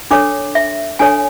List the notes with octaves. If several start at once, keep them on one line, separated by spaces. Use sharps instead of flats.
D4 A4 C#5 D6
E5
D4 A4 C#5 G#5